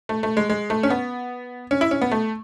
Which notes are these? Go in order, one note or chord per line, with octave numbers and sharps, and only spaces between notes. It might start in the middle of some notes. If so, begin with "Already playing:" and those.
A3
A3
G#3
G#3
A3
C#4
B3
C#4
E4
C#4
B3
A3